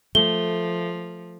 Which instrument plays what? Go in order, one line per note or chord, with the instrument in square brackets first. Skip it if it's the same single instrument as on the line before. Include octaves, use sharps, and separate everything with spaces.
[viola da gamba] F3 [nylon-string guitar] A3 [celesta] G7